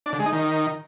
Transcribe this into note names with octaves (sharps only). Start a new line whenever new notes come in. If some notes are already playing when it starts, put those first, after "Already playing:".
D4
D3
G#3
D#4
D#3